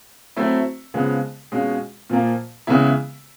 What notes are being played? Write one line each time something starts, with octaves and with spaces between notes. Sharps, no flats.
F#3 A3 C4 E4
C#3 F3 G#3 B3
B2 G#3 C#4 F4
A#2 F3 A#3
C#3 E3 G#3 B3 E4